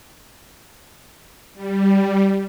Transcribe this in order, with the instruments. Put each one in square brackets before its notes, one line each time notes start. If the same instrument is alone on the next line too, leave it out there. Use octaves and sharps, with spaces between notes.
[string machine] G3